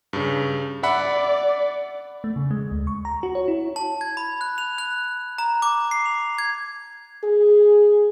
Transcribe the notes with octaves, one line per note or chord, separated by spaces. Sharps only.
G2 C#3
D5 E5 F#5 B5
A3
C#3
G#3
D2
C#6
A#5
F#4
C#5
E4
A5
G#6
B5
F#6
F7
F#6
A#5
D6
C7
F7
G#6
G#4